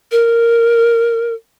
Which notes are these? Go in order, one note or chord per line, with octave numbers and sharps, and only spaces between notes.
A#4